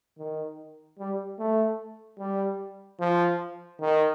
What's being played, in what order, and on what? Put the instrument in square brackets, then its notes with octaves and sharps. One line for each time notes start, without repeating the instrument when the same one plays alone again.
[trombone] D#3
G3
A3
G3
F3
D#3